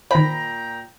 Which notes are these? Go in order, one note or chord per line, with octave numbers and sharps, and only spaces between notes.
A#2 D#3 C5 G5 A#5 B5